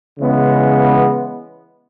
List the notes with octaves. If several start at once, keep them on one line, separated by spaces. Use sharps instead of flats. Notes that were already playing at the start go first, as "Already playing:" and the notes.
C#3 E3 G#3 B3